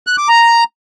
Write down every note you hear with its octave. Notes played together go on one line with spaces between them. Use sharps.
F#6
D6
A#5